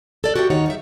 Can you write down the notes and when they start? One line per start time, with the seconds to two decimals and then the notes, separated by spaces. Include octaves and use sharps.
0.24 A4 D5
0.36 F#4 G4 A4 E5 G5
0.50 D#2 D#3 D#4 C#5 F#5
0.66 G3 G#4 E5